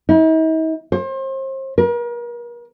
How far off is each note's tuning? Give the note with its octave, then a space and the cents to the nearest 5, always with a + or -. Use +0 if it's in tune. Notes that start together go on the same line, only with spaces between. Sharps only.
D#4 +45
C5 +35
A#4 +40